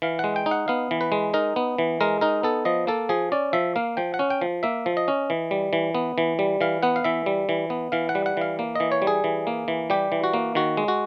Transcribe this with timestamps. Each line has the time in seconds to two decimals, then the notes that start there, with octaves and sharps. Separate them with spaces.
0.02 E3 F5
0.19 G#3 F#5
0.36 G5
0.46 D#4
0.51 F#5
0.68 B3 F5
0.91 E3
1.01 B4
1.12 G#3
1.34 D#4 A#4
1.56 B3
1.78 E3
2.01 G#3 A#4
2.21 D#4 A#4
2.43 B3 A4
2.65 F3 D#5
2.87 A#3 A4
3.09 F3 G#4
3.32 C#4 D5
3.53 F3 E5
3.76 A#3 F5
3.97 F3 G5
4.14 F#5
4.19 C#4
4.30 G5
4.41 F3
4.63 A#3 E5
4.86 F3
4.97 D#5
5.08 C#4
5.30 E3
5.51 G3
5.73 E3
5.95 B3
6.18 E3
6.39 G3
6.61 E3 F5
6.83 B3 F#5
6.96 F5
7.04 E3 E5
7.26 G3
7.49 E3
7.70 B3
7.92 E3 F5
8.09 F#5
8.15 G3
8.26 F#5
8.37 E3 F5
8.59 A#3
8.75 E3 D#5
8.92 C#5
9.02 G3
9.07 G#4
9.24 E3
9.47 A#3
9.68 E3
9.90 G3 G4
10.12 E3
10.24 F#4
10.34 A#3
10.55 D#3 F#4
10.77 G#3
10.88 F#4